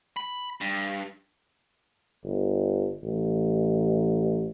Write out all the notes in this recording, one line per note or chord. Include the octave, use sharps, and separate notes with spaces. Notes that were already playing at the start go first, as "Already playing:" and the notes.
B5
G2
G1
A1